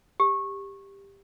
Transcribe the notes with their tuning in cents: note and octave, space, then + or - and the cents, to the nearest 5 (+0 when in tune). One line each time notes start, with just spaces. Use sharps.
G4 +15